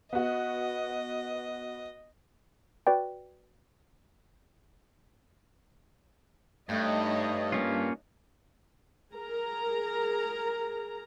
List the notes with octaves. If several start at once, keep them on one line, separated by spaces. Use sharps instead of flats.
B3 F#4 D#5
F#4 B4 D5 G5
G2 A3 D#4 C#5 D#5
A#3 C#4 F4
G#4 A#4 A#5